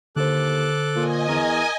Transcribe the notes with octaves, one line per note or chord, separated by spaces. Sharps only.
D#2 D3 A4 C5 D6 F#6
A#2 D#5 G#5
E2 A#4